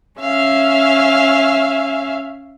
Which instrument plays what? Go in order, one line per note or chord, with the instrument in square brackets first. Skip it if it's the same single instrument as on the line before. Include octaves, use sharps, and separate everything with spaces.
[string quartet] C#4 E5 F5 G#5